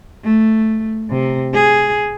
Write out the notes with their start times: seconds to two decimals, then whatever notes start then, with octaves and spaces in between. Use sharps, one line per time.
0.24 A3
1.10 C3
1.54 G#4